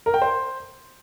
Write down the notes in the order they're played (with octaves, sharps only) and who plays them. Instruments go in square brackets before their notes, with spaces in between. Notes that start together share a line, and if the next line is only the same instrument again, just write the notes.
[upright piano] A#4
G5
C5